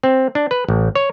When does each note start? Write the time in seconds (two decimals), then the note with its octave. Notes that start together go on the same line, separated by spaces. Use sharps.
0.03 C4
0.35 D4
0.51 B4
0.69 A1
0.95 C#5